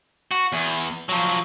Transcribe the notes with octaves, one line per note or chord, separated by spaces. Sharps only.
F#4
E2
F3 F#3